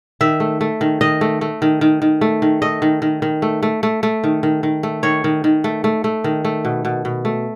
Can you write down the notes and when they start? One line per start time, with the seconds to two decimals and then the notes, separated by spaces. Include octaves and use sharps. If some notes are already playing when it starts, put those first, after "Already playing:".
0.21 D#3 E5
0.40 A3
0.61 A3
0.81 D#3
1.01 D#3 D#5
1.21 A3
1.41 A3
1.62 D#3
1.81 D#3
2.02 D#3
2.21 A3
2.42 D#3
2.62 A3 D#5
2.82 D#3
3.02 D#3
3.22 D#3
3.42 A3
3.63 A3
3.83 A3
4.03 A3
4.24 D#3
4.43 D#3
4.63 D#3
4.83 A3
5.03 D#3 C#5
5.24 D#3
5.44 D#3
5.64 A3
5.84 A3
6.04 A3
6.24 D#3
6.45 A3
6.65 B2
6.85 B2
7.05 B2
7.25 A3